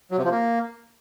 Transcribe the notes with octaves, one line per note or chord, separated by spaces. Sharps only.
F#3
C3
F3
A#3